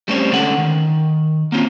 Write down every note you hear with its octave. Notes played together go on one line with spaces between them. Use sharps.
G3 A3 C4 C#4 C5 C#5
D3 G#3 C#4 A4 F#5
D#3
A#3 C4 C#4 F4